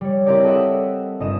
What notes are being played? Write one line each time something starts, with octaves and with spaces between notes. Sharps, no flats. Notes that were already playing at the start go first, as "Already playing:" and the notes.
G3 C#5
C4 E4 G4 A#4 D5 G5
A4 D#5 E5 F#5
G1 D#5 E7